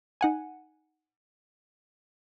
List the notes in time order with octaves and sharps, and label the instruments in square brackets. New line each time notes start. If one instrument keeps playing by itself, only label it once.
[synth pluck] D#4 F#5 G#5